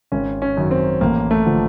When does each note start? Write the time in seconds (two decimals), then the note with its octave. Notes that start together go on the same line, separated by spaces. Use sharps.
0.12 G#1 C#4
0.42 C#4
0.57 F#2 D#3
0.71 C4
1.01 A1 A#3
1.31 A3
1.46 D3 F3